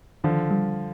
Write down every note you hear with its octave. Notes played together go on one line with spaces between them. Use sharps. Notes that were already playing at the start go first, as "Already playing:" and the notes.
D3 D#3 F3
G3